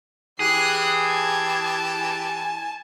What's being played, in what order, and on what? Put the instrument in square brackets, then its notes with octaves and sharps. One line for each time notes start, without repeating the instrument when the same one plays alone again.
[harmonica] E3 G4 [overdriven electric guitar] G#4 [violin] F#6 C7
[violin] A5 [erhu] G#6
[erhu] G#5